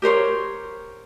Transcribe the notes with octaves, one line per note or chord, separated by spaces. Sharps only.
G4 A#4 C5 C#5